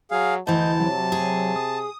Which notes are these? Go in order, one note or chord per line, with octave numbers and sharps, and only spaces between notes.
F#3 G#4 F5
D2 E3 D#5 A5 G6
C3 F#3
G#4
D#6